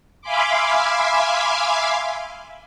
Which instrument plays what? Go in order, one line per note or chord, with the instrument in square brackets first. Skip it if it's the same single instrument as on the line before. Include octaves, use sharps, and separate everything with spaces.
[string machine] E5 F5 G#5 B5 C6 D6